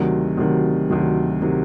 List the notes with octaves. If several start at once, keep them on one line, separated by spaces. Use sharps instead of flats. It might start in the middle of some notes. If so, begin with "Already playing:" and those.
Already playing: D2 C3 D#3 F#3
D2 C3 D#3 F#3
D2 C3 D#3 F#3
C3 D#3 F#3